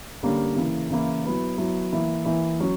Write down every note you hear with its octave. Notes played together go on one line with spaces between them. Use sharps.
D3 G3 A#3 C#4
C#3 E3 A#3 E4
C#3 E3 A#3 E4
F#3 B3 E4
F#3 B3 E4
E3 A#3 E4
E3 A#3 E4
F#3 C#4